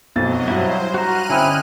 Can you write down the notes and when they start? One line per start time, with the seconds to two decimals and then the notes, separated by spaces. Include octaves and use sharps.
0.16 B1 F2 F#3 D#5 A6
0.48 G2 F#3 E4 C5
0.94 F#4 A#5 F6 F#6 D#7
1.29 D3 C4 C#4 E4 D#5 G#5